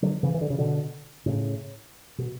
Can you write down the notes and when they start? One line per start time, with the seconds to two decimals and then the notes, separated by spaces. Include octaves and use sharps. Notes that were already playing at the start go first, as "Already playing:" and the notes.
0.02 D3 F#3
0.23 C#3 E3
0.34 E3
0.41 D3
0.50 C#3
0.58 B2 D3
1.26 A2 C#3
2.18 B2